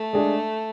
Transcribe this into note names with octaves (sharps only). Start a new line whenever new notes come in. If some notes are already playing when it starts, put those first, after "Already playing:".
Already playing: A3
G#3 D4 G#4